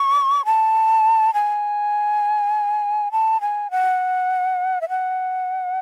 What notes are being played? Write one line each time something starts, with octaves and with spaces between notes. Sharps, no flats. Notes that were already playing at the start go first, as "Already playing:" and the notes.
Already playing: C#6
A5
G#5
A5
G#5
F#5
E5
F#5